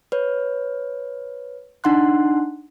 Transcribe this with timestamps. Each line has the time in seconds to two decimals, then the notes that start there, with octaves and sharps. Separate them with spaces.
0.12 B4 C#5
1.84 D4 D#4 F#5 C6 F#6